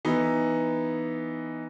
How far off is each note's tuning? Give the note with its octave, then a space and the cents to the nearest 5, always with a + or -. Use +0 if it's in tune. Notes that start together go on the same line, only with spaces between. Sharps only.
E3 +0 B3 +0 D#4 +0